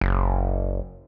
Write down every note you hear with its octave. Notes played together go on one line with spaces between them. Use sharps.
F#1